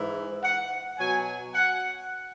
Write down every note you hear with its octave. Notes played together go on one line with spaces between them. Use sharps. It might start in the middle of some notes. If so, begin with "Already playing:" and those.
Already playing: G#2 E3
F#5
B2 F#3 G#5
F#5